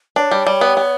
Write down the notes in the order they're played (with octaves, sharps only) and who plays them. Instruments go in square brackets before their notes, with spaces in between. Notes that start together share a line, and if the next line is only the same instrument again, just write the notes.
[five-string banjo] D4 [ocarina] C#5
[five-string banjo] G3
G3
B3
B3